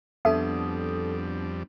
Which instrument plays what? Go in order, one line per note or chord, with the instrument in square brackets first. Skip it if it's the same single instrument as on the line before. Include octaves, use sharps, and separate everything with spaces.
[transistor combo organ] F2 G3 [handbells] B3 D4 [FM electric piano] A4 D#6 [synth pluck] E5